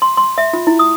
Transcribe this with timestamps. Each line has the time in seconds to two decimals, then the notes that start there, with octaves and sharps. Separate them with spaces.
0.02 C6
0.17 C6
0.38 E5
0.53 F4
0.67 E4
0.79 D#6